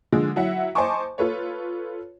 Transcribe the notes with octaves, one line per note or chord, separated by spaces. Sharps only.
D3 F3 G#3
F#3 E4 E5 F#5
C5 D#5 G#5 A5 C#6 D6
F4 A4 B4 C#5